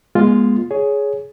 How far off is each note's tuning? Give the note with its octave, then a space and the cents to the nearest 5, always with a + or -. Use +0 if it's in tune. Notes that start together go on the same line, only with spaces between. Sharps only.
G#3 +0 B3 -35 F4 +0
G#4 +10 C#5 +10